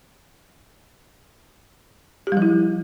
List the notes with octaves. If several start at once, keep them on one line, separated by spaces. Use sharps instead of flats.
G4
G3
F3
E4